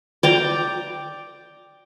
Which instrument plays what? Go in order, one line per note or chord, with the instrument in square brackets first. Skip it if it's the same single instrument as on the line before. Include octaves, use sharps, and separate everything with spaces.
[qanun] D5 G5 A#5